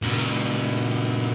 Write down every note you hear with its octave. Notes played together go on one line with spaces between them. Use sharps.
A#2 C#3